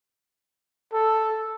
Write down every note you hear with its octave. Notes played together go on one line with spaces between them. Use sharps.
A4